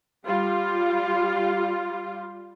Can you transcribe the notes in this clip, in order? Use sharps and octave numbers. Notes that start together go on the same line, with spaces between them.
G3 F4